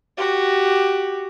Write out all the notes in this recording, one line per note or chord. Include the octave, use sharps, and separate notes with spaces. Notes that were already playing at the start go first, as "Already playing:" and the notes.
F#4 G4